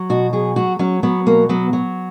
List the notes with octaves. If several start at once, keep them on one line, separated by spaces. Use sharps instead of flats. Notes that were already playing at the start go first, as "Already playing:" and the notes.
Already playing: F#3
B2 F#4
F#3 G#4
F#3 F#4
F#3 C#4
F#3 B3
B2 A#3
F#3 B3
F#3